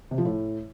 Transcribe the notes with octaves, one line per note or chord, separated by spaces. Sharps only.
C3
F3
A2